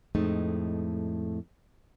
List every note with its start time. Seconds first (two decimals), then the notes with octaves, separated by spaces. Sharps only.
0.15 F2 A2 G#3 A3 D#4